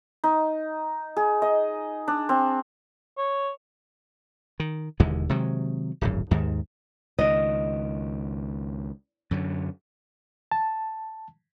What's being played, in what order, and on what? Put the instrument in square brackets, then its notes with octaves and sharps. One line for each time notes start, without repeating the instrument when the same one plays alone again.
[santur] D#4
G#4
D#5
D4
C4
[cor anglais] C#5
[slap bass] D#3
E1 D#2 D3 G#3
C3 D#3 F#3 G#3
D1 G#1 F#2
D#2 G#2 D#3
[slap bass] C#2 D#3 [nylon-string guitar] D#5
[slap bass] F#2 D3 F#3
[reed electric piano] A5